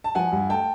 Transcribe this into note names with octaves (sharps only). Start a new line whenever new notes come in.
A5
F3 F#5 G#5
G2
A3 G5 A5